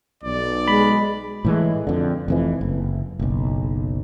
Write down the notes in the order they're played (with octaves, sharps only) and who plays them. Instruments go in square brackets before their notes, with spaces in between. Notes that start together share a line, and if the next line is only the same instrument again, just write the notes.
[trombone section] B1 [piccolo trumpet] D5
[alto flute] G#3 [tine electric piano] B5
[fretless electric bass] A2 E3 G#3
F2 D3
F1 F2 E3
F#1
F#1 B1